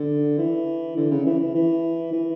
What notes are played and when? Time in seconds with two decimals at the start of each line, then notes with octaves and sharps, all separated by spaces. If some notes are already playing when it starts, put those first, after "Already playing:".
Already playing: D3
0.38 E3
0.96 D3
1.11 C#3
1.25 E3
1.40 E3
1.55 E3
2.13 E3